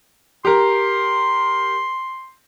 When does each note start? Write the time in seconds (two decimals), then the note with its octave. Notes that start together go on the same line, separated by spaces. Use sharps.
0.45 G4 A#4 C6